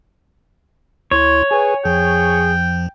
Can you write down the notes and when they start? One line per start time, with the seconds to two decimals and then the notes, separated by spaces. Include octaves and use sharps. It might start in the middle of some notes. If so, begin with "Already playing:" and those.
1.11 D2 E4 C#5 C6
1.51 G#4 B4 G#5
1.85 F2 F3 G#4 G5